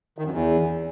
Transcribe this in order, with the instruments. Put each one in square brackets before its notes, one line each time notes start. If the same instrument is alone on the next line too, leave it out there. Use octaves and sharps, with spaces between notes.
[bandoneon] D#3
F#2
E2